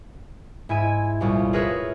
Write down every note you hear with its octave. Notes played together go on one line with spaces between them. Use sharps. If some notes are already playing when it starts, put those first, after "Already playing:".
G#2 E4 E5 G#5 D#7
C2 F2 A#2 C#4
G#4 A#4 B4 C#5 E5